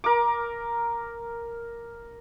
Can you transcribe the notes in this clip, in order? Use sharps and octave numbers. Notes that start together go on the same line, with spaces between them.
A#4 D6